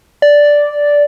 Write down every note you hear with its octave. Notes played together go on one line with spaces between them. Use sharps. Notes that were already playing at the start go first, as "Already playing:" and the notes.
D5